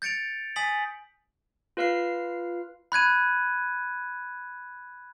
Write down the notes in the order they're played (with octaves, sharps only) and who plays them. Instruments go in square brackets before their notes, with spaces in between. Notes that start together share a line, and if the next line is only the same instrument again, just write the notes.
[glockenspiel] G6 A6 C#7 D7 F7
G#5 D#6 A6 B6 F#7
[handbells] F4 B4 F5 F6 C7
[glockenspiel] B5 F#6 G#6 D#7